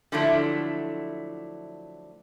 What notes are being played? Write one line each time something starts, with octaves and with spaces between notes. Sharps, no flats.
D3 F3 F#3 A3 D4 E4